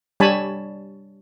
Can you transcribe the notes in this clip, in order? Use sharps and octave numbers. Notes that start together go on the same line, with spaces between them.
G3 D4 C#5 G#5 A5 B5